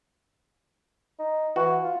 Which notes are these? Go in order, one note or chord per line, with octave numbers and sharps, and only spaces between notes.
D#4
E3 F#4
F4